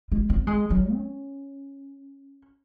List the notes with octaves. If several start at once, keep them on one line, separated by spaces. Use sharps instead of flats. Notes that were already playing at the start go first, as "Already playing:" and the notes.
G#3
C4
G#3
F#3
C#4